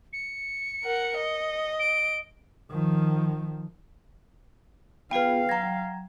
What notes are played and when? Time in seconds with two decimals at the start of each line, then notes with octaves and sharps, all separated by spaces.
0.13 C#7
0.84 A#4 F#5
1.18 D#5
1.79 D7
2.70 D#3 F3
5.11 B3 F4 G#4 B4 F5 G5
5.49 F#3 G5 A#5 G#6